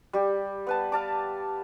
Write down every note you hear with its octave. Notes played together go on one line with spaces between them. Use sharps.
G3 G4
B3 B4 A5
F5 A5 D6